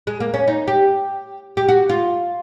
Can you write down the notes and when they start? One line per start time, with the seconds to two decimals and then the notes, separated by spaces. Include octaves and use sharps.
0.07 G#3
0.20 A#3
0.34 C#4
0.48 D#4
0.67 G4
1.57 G4
1.69 F#4
1.89 F4